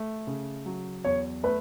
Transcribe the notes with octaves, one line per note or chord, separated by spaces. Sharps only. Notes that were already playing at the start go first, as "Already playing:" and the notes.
Already playing: A3
C#3
F#3
E2 C#5
A3 B4